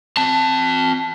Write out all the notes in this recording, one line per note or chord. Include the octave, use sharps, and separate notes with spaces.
C4 A5